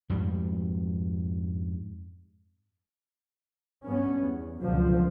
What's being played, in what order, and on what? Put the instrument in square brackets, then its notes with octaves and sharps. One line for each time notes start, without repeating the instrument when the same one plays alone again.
[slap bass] F2 G#2 G3
[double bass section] G2 B3 C#4
E2
C#2 F#2 B2 D3 F3